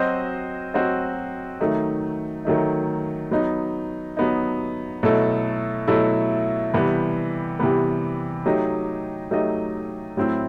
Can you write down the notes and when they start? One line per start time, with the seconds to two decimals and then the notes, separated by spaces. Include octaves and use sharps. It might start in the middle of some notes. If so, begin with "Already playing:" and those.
Already playing: F#3 C4 F#4 C5 D#5
0.74 F#3 C4 F#4 C5 D#5
1.60 D#3 F#3 A3 D#4
2.45 D#3 F#3 A3 D#4
3.31 F#3 B3 D#4
4.17 F#3 B3 D#4
5.03 B2 F#3 A3 E4 A4
5.88 B2 F#3 A3 E4 A4
6.74 C3 E3 G3 B3
7.59 C3 E3 G3 B3
8.46 F#3 A3 D#4 G4 D#5
9.31 F#3 A3 D#4 G4 D#5
10.17 A2 F#3 C4 E4